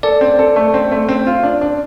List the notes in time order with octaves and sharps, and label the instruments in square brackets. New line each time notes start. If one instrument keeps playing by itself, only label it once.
[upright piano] A4 [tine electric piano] D5
[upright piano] C4
A4
A3
C4
A3
C4
F4
D4
D4